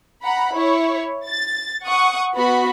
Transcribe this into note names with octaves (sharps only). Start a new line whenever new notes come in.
F#5 A#5 B5
E4 C#5
A6
F#5 C#6 D#6
B3 F#4 B5